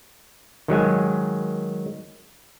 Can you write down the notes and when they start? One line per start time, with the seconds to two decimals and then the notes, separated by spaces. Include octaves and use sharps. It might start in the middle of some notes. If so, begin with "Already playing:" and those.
0.68 D#3 F#3 G#3 G#5